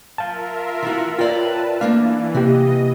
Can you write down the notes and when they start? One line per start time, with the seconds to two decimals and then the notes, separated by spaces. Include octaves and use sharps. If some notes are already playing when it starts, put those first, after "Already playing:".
0.18 F4 A#4 E5 F5 A5
0.83 E3 F#4
1.19 F4 A#4 B4 C#5 D5 G5 A5
1.81 E3 A3 A#3 D4 F5
2.34 C3 A#3 G4 D#5